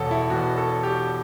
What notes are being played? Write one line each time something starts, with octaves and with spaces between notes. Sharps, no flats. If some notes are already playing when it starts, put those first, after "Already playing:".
Already playing: E1 E2 B2 A4 C#5
E4
E1 E2 B2 F#4
A4
G4